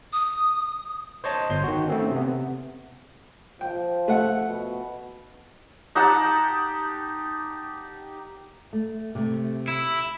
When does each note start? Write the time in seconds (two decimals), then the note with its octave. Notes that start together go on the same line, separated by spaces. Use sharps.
0.13 D#6
1.24 C5 C#5 D#5 A5
1.50 G1 C6 G6
1.64 D#3 F#4
1.88 A3 C4 C#4
2.11 C3 B3
3.61 F3 G5
4.08 A3 F#5
4.48 B2
5.95 D#4 G4 F#5 A5
8.73 A3
9.15 C3 A3
9.68 E4